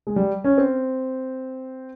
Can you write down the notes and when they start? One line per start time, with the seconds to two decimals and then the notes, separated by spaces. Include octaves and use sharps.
0.07 G#3
0.16 G3
0.44 C#4
0.58 C4